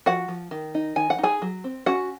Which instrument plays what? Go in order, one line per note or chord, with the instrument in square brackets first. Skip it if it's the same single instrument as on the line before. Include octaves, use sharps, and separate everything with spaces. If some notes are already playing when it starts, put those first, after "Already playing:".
[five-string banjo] F3 F#4 F#5
F3
D#3
D#4
D#3 G#5
F#5
D#4
G#4 G#5
F#3
C4
C#4 F#4 F#5